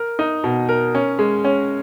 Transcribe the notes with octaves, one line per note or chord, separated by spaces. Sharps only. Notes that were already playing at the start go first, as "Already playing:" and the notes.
Already playing: A#4
D#4
B2
A#4
C#4
G#3
C#4